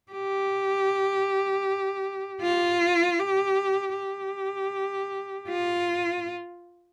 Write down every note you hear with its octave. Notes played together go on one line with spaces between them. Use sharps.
G4
F4
G4
G4
F4